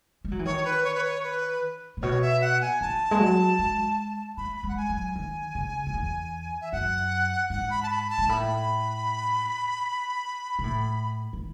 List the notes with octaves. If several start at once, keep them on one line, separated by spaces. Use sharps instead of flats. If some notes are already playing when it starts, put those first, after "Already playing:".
G#3
F#3
E3
D#3 C#5
B4
C#5
B4
C#5
B4
A2
B2 C#5
E5
F#5
G#5
D#3 A5
G#3
F#3
G#3
A3 B5
B5
G#3 F#5
G#5
F#3
G#5
D#3
C#3
F#2
E2
E5
F#2 F#5
G#2 F#5
B5
A5
B5
A5
G#2
A2 B5
B2
A2
D#3